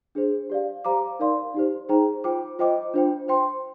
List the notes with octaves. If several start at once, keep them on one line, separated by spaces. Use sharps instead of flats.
D4 G#4 C5
G4 D5 F5
G4 C5 F5 A#5 D6
D#4 A#4 D5 F5 C6
D#4 G4 C5
D#4 G#4 C5 G5 A#5
F4 C5 G5 D6
F4 C5 D#5 G5 D6
D4 F4 C5 G5
C5 G5 C6